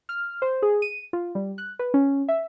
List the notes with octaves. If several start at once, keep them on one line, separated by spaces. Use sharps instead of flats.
F6
C5
G#4
D#7
F4
G3
F#6
B4
C#4
E5